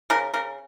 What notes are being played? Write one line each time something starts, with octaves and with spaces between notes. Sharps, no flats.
C#3 A#4
C#3 A#4